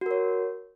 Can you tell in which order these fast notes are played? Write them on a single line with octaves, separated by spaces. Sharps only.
F#4 A#4 C#5